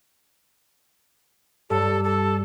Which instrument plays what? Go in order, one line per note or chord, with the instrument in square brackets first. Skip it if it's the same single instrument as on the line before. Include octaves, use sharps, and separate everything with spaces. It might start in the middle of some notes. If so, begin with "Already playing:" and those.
[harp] G2 [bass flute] G4 [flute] A4
[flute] A4